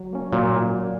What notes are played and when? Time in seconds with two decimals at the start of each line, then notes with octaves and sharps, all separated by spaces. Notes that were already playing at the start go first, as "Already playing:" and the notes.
Already playing: F#3
0.13 A#3 C#4
0.33 A#2 F#3